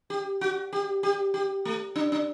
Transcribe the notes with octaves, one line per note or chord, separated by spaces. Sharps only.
G4
F#4
G4
G4
G4
A3
D4
D4